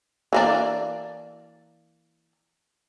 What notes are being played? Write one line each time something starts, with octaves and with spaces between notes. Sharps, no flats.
E3 A#3 D4